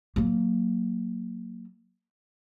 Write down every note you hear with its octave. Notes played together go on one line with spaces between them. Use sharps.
F#3 A#3